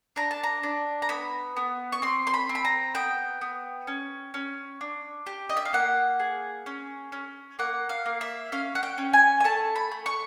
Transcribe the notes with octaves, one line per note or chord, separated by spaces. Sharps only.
D4 A#5
A5
A#5
D4
A#5
B3 B5
B3
C#6
C4 C6
C6
B5
C4
B5
A#5
B3 G5
B3
C#4
C#4
D4
G4
D#5
E5
F5
A#3 F#5
G#4
C#4
C#4
A#3 F#5
F5
A#3
E5
C#4 F5
F#5
G5
C#4
G#5
G#5
A3 A5
B5
A3
C#6